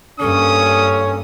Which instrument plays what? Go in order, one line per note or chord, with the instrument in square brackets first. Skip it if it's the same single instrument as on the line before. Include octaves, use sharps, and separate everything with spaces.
[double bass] G2 A#3 [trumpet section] C#4 [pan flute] A4 [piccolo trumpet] D#6